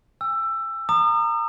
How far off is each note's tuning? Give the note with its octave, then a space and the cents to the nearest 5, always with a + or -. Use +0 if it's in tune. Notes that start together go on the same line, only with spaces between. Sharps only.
G#5 -45 E6 +15
A#5 -20 D#6 -40